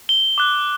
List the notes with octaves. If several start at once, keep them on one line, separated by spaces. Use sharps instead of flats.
G7
D6 F#6